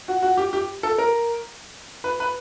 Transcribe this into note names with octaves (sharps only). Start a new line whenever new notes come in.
F#4
F#4
G4
G4
A4
A#4
B4
B4